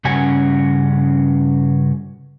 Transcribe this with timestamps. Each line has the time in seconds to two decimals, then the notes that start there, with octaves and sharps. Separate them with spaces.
0.05 G2 C#3 C#4 F#4 G#5